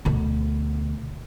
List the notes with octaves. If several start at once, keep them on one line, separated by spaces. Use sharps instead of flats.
D2 B2